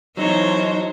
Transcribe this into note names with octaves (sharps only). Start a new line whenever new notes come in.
E3 F#3 D#4 C5 C#5